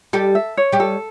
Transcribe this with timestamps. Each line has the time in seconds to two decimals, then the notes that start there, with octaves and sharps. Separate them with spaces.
0.13 G3 G4 A4
0.35 E5
0.57 C#5
0.72 G3 G4
0.80 A4